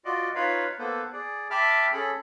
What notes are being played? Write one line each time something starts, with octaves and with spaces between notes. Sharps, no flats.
F4 F#4 D5 D#5
D#4 F4 B4 C#5 F5 B5
A#3 B3 A4 B4 C5
G#4 D5
E5 G5 A5 B5 D6 F6
C#4 G#4 A4 B5